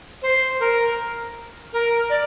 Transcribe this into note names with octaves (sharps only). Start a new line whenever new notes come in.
C5
A#4
A#4
D5